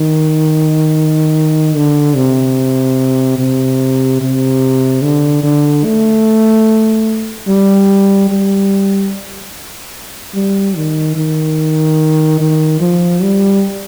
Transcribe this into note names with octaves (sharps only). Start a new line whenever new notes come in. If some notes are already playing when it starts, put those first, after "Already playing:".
Already playing: D#3
D3
C3
C3
C3
D3
D3
A3
G3
G3
G3
D#3
D#3
D#3
F3
G3